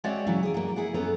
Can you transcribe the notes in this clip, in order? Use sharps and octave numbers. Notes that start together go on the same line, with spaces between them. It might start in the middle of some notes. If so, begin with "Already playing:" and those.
G#3 C4 F#4 C#5 D5 E5
C#3 E3 F#3 E4
G#4 D5
F#3 A#3
E4 G#4 F#5
F#2 B3 A4 B4 C#5 A#5